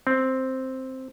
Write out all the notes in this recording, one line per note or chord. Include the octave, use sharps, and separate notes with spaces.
C4